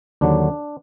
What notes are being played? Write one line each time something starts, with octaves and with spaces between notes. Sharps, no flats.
D#2 D3 F#3 D4